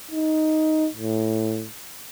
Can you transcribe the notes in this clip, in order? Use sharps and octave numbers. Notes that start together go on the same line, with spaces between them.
D#4
A2